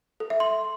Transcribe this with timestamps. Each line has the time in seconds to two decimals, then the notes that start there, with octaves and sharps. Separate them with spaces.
0.20 A4
0.30 E5
0.40 C6